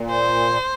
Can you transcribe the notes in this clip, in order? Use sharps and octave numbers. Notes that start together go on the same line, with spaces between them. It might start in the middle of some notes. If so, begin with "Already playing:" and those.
Already playing: A#2
C5